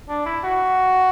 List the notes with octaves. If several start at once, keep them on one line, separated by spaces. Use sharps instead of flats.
D4
E4
F#4